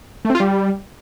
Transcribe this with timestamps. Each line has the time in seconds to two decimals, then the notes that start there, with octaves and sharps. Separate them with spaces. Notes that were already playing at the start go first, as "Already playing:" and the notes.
0.25 A3
0.30 C4
0.35 F4
0.40 G3